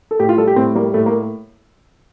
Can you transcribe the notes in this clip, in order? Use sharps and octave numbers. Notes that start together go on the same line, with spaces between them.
A4
A2 G4
F4
G3 A4
G4
A2 C4
G3 A#3
A2 A3
A#3